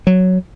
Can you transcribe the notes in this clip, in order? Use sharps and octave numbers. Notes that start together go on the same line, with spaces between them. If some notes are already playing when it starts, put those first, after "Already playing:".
F#3